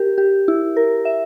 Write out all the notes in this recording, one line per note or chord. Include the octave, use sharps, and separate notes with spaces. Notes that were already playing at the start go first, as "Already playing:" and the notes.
Already playing: G4 A#4
G4
E4
A#4
E5